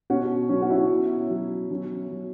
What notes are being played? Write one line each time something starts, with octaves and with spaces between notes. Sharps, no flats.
B2 C#4 F#4
F#3 C#4
F#4
E4
B2
F#3
F#3 C#4
F#3